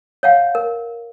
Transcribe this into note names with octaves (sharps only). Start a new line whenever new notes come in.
C#5 F5 F#5
A#4